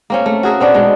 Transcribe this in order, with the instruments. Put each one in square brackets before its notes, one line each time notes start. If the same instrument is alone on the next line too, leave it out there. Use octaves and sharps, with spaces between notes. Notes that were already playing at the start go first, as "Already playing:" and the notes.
[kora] A#3 C4 C#4
A3
F#4 G#4 A#4 E5
B3 C4 D4 F#4
B2 G#3